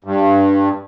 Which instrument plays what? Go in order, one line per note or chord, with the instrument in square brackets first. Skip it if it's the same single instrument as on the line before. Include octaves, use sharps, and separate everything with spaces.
[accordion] G2